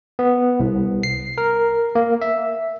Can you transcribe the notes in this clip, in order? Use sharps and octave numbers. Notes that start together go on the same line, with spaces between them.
B3
C2
C7
A#4
A#3
E5